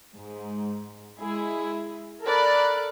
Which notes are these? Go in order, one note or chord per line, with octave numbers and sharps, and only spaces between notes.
G#2
G#3 E4 G#4
A4 A#4 D5 B5 F#6